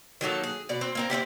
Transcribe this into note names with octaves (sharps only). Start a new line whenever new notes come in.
D#3 F#3 A#3 A4
G#4
B2 D5
C4
A#3 C4 A#4
C4 C#4 E4 G4